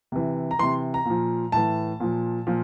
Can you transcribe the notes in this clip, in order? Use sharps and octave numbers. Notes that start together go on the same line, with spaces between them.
C3 E3
A#5
C3 E3 C6
A#5
A#2 F3
A2 E3 A5
A#2 F3
A#2 F3